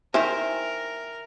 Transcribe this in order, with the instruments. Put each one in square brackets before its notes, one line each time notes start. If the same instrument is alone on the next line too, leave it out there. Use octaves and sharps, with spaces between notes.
[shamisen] D#3 E4 C5 [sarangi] A#4 [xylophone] E5 G5 G#5